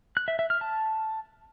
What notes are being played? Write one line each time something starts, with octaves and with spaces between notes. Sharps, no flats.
F#6
E5
E5
F6
A5